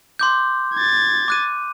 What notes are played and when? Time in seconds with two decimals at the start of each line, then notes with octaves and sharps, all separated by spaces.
0.19 C6 D6 G6
0.74 G#6 A6
1.28 D6 F#6 D#7